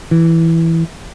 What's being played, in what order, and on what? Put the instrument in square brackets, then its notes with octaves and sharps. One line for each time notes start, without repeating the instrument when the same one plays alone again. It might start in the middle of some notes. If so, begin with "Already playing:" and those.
[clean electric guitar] E3